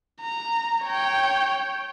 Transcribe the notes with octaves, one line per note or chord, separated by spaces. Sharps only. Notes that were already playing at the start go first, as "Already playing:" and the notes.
A#5
C#5 G5